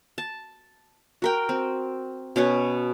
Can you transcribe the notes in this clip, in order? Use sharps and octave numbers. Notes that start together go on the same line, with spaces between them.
A5
F#4 A#4 G5
C4
B2 C#4 B4 C#5